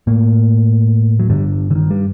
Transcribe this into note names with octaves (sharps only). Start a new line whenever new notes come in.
A2 A#3
F#3
G2 D3 G3
D3
D#3
G3